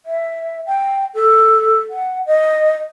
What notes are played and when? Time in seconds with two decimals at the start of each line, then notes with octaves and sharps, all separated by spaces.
0.06 E5
0.67 G5
1.15 A4
1.90 F#5
2.26 D#5